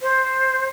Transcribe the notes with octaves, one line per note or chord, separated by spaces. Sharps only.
C5